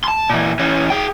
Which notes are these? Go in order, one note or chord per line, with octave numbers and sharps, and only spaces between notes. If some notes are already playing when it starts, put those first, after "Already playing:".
A5 C6
A#2 E3
E3 C#4
G#4 G5